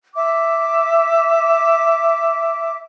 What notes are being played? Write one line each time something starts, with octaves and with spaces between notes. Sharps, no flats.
E5 D6